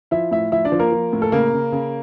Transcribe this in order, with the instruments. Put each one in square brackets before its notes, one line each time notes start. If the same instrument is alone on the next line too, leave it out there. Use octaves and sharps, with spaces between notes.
[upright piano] F3 E4 E5
A2 E4 E5
F3 E4 E5
D4 D5
F3
A#3 A#4
F3
A2
A4
C#3 A#3 A#4
C#3
C#3